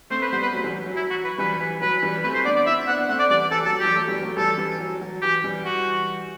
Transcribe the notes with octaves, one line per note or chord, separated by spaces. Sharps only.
A3 C4 C5
B4
G3 B3 C5
B4
F#3 A3
E3 G3
F#3
F#3
E4
F#4
B4
E3 G3 B4
E3
F#3 B4
E3 G3
A3 C4 B4
C5
B3 D4 D5
D5
C4 E4 E5
B3 D4 F#5
A3 C4 F#5
D5
E3 G3 D5
E3 A4
F#3
A4
F#3
E3 G3 G4
F#3 A3
E3 G3
F#3 A3
E3 G3 A4
E3 G3
F#3
F#3
E3 G4
E3 G3
F#4